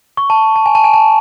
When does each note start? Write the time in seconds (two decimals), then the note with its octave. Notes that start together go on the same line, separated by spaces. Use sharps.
0.17 C#6
0.30 A5
0.56 A5
0.66 G#5
0.75 A5
0.84 G#5
0.94 A5